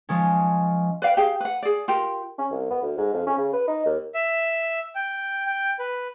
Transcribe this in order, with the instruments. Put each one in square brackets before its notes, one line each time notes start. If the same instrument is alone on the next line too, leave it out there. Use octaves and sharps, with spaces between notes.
[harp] F3 G#3 C#4
[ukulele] B4 D5 F5 G5
G4 G#4 F5
B4 F#5
G#4 D5
F4 G4 A#4
[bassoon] C#4
C2
B3
D2
G#2
F2
C#4
C#3
B4
D#4
D#2
[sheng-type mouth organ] E5
G5
G5
B4